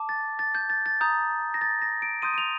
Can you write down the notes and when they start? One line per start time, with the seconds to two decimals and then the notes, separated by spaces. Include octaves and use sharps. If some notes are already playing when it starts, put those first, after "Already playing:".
Already playing: A5 D6
0.09 A6
0.39 A6
0.55 G6
0.70 A6
0.86 A6
1.01 A#5 D#6 G6
1.54 A#6
1.61 A6
1.82 A#6
2.02 D7
2.22 C6 D#6 G6 D#7
2.34 D#7
2.38 F7